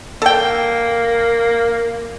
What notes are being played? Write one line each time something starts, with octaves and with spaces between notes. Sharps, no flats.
A#3 A4 G5